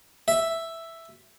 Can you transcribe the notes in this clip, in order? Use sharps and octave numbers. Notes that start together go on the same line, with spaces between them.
E5